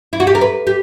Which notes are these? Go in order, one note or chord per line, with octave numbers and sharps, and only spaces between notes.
E4
F#4
G4
A#4
B4
G4